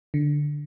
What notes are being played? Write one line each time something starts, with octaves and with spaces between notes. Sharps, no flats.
D3